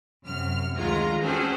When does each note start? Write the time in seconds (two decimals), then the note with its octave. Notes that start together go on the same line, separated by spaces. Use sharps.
0.25 F#2 C3 F6
0.76 D2 D#3 G#3 F4 A#5
1.21 C4 C#4 F#4 G#4 A4 C5